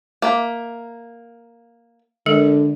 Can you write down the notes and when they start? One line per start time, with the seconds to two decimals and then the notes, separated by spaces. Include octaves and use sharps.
0.22 A#3 E5
2.26 D3 G#3 A4 A#4